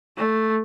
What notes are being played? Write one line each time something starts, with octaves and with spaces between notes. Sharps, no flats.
A3